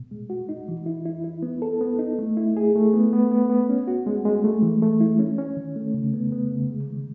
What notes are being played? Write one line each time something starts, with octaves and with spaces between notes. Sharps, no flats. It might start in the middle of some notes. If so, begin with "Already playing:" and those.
Already playing: B2
G#3
F#4
D#4
E3
E4
E4
E4
B3
A4
B3
D#4
A3
E4
G#4
A3
B3
B3
B3
B3
C#4
F#4
G#3
G#3
A3
E3
A3
E4
C#4
C#4
D#3
A3
C#3
B3
B3
C#3
G#3
D#3